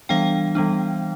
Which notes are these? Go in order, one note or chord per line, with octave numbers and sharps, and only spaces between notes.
E3 G3 B3 D4 F5 G5
E3 G3 B3 D4